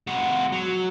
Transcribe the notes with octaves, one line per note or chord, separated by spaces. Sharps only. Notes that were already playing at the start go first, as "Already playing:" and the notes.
G#3 F#4
F#3